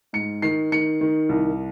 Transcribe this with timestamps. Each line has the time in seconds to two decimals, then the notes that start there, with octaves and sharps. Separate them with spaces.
0.13 G#2 C#7
0.42 D#3 C7
0.72 D#3 C#7
1.01 D#3
1.29 C2